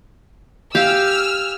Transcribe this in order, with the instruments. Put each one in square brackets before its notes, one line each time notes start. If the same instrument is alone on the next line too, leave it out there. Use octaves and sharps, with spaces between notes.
[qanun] G4 F5 [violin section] G#5 E6 F6